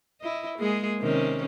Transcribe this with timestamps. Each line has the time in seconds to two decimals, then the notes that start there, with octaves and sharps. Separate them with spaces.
0.21 E4 D#5
0.59 G#3 A#3 G#4
1.00 C3 D#3 C#4